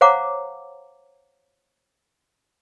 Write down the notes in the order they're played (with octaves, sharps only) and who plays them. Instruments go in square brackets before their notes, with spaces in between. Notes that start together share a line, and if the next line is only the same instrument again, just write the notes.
[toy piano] C5 C#5 F5 F#5 A#5 D6